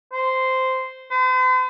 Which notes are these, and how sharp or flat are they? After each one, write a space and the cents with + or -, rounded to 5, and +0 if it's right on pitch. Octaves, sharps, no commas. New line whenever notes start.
C5 -10
C5 -45